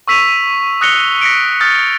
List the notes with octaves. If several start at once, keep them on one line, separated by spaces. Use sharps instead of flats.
C#6 E6 B6 D#7 F7
D#6 F#6 A#6 C#7 F7 G7
A#6 B6 C#7 D7
D#6 F6 G6 A6